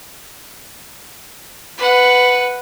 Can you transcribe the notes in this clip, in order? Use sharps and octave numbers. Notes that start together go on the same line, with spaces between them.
B4 F#5